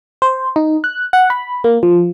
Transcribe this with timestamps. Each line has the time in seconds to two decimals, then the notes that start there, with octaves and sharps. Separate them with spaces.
0.22 C5
0.56 D#4
0.84 F#6
1.13 F#5
1.30 B5
1.64 A#3
1.83 F3